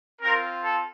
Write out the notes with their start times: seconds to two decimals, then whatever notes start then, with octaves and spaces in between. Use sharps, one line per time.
0.21 C4 F4 A#4
0.62 A4